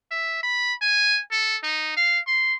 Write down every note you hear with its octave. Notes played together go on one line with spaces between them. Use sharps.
E5
B5
G#5
A4
D#4
F5
C6